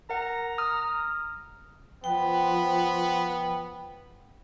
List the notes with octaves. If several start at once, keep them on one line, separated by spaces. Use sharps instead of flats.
A#4 F#5 A#5
D#6 F6
F3 B3 G5